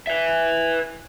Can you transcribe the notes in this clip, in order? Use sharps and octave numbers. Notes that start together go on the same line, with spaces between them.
B4 E5